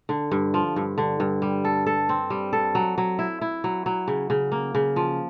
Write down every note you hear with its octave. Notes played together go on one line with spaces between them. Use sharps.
D3
G2
F3
G2
D3
G2
G3
A4
A4
C4
G3
A4
F#3
F#3
E4
E4
F#3
F#3
C#3
C#3
A#3
C#3
F3